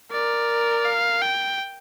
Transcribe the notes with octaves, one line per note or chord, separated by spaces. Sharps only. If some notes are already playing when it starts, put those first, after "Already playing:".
A#4 D5
F5
G5